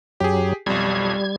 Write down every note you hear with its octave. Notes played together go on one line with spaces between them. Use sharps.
F#2 F#3 G4 G#4
B1 F2 G3 G#6